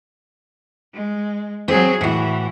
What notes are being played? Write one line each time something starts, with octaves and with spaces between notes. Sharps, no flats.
G#3
F#3 C4 G#4
A2 E3 F#4